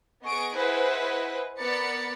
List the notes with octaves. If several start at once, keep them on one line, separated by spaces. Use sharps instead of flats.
B3 G#4 D#5 C#6 D7
E4 G#4 B4 C5 D#5 F#5
B3 A#4 D5 B5 A6 C#7